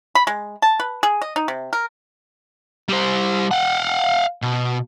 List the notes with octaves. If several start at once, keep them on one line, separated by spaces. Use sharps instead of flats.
B5
G#3
A5
B4
G#4
D#5
D#4
C3
A#4
G3 C5
F5 F#5
B2